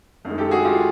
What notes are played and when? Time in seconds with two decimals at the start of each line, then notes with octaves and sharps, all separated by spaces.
0.25 F#2 D#3 G#3
0.38 G4 A4
0.51 F#4 G#4
0.65 F4 G4